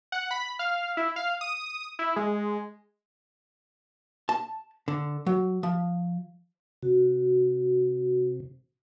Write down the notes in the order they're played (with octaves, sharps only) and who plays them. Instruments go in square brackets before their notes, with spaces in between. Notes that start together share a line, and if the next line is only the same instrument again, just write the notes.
[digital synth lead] F#5
B5
F5
E4
F5
D#6
E4
G#3
[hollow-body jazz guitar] A5
D3
F#3
F3
[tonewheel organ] C3 [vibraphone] F#4